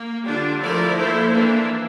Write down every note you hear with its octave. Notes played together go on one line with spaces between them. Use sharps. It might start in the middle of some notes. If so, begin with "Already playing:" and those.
Already playing: A#3
D3 G3 D4 F4
F3 A3 E4 A#4 D5
A#3 E4 A4 C5
E3 A#3 D4